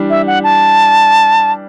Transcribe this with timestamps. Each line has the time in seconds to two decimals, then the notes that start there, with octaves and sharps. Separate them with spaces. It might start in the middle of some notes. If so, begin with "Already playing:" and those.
Already playing: E3 G3 D4
0.10 E5
0.27 F#5
0.44 A5